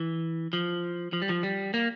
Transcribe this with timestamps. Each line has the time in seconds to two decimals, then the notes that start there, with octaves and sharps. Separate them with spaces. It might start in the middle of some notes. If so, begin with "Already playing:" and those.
Already playing: E3
0.53 F3
1.13 F3
1.22 G3
1.29 F3
1.43 G3
1.74 A#3